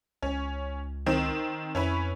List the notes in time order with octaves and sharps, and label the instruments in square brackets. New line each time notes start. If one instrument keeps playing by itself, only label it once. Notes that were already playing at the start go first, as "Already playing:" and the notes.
[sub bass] C#2 [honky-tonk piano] C#4
[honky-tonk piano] D#3 C4
[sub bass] F2 [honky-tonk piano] C#4 E4 B4